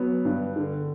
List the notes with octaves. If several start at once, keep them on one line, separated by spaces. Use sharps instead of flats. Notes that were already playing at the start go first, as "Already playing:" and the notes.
Already playing: F#3 B3
G2
D3